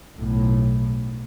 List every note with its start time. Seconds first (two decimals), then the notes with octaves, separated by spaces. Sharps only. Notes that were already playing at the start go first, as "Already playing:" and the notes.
0.15 B1 A2